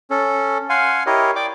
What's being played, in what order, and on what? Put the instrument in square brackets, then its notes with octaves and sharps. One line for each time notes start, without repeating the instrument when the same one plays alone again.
[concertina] C#4 A4
F5 F#5 G#5 C6
E4 G4 A#4 C#5 D#5
D5 G5 D6